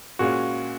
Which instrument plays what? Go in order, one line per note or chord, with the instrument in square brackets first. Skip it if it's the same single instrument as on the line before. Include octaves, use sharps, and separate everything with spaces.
[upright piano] A#2 G#3 C#4 F4 [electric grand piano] F#4